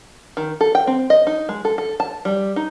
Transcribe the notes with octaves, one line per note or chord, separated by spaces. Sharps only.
D#3
A4
G5
C4
D#5
D#4
G#3
A4
A4
A5
G3
D#4